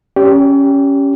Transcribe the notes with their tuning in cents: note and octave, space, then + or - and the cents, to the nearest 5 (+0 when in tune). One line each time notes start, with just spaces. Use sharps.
C#4 +0 G4 +0 C#5 +45